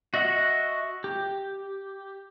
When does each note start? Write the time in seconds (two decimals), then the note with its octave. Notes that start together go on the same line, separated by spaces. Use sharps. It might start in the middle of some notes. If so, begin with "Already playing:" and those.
0.14 F#4 D#5 E5 F#5
1.04 G4